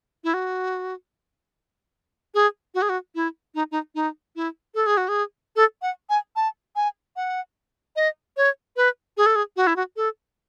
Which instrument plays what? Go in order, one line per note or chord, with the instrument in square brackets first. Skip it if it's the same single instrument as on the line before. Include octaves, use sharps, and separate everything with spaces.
[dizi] E4
F#4
G#4
F#4
G#4
F#4
E4
D#4
D#4
D#4
E4
A4
G#4
F#4
G#4
A4
F#5
G#5
A5
G#5
F#5
D#5
C#5
B4
G#4
A4
G#4
F#4
E4
F#4
A4